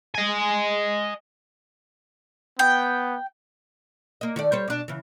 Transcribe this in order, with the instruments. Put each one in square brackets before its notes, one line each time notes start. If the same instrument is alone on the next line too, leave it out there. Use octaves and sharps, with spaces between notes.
[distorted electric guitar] D#5 G#5
[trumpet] B3 [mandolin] G5
[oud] A#3 D#5
D#3 A3 D5
G3 C5 C#5
B2 D4
C#3 E3